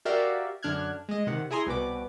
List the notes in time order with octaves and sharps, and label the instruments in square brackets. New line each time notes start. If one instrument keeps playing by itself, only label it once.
[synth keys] F#4 G4 A#4 D5 E5 F5
F#2 D3 D4 F6 F#6 G#6
G#3 D#5
C3 D#3 F#5
E4 G#4 G#5 A#5 C6 D#6
C2 B2 F#4 B4 D6